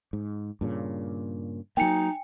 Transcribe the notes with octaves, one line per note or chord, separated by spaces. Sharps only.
G#2
G2 A#2 C#3
F#3 A#3 D#4 G5 G#5 C#7